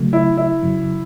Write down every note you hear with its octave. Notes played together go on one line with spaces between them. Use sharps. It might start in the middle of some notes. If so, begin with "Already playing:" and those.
Already playing: C#3 F#3 A3
E4
E4
F#2 C#3 F#3